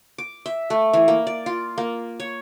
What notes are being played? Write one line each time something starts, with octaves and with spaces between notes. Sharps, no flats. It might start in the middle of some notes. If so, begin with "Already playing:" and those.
D6
E5
A3
E3
A#3
D5
F4
A#3
C#5